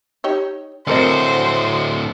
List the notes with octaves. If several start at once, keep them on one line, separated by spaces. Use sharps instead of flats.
D#4 G4 C#5
D2 A2 C4 A#4 C5 D#5